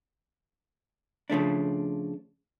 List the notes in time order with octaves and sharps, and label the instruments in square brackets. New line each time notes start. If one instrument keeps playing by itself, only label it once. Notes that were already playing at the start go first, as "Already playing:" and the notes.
[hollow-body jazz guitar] C#3 F3 A3 D4